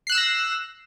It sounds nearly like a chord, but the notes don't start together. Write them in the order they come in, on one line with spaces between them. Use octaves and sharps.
C7 F#6 E7 E6 A#6